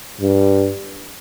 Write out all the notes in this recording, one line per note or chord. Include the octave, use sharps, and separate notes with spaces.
G2